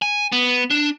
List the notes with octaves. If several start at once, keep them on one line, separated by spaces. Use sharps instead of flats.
G#5
B3
D4